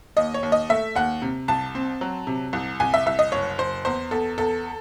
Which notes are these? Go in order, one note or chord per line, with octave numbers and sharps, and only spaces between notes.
D#2 D#5
C#5
D#2
D#5
A3 E5
D#2 F#5
C3
C2 A5
C4
F#3
C3
C2
C2 G#5
E5
C2 E5
D#5
F#1 C#5
F#1 C5
E2 C5
E2 A4
E2 A4